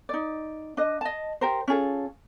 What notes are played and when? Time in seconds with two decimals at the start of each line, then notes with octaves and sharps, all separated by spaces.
0.09 D#4 D5
0.77 D4 D#5
1.01 D#5 A5
1.41 G4 A#4 C5
1.68 C#4 F4 G#4 A4